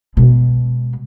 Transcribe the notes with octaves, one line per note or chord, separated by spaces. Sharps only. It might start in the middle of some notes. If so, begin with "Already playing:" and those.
B2 G#3